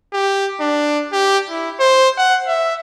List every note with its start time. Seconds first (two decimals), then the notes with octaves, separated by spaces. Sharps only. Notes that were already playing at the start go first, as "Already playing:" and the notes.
0.13 G4
0.60 D4
1.13 G4
1.49 E4
1.80 C5
2.17 F#5
2.48 E5